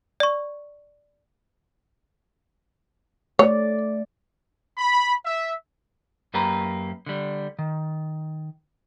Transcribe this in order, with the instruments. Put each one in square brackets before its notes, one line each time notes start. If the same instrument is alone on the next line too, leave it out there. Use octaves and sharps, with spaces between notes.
[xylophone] D5 C#6
[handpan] A3 D5 [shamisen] C#5
[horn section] B5
E5
[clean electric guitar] F#2 A#3 G4 B4 A#5
D3 G3
D#3